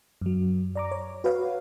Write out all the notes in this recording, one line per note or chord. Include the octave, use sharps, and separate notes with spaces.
F#2 F#3
D5 A#5 D6
C#5
F#4 B4 C#5 F5